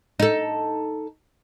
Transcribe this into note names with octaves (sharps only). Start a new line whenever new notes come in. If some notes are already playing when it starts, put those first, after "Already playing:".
D#4 A4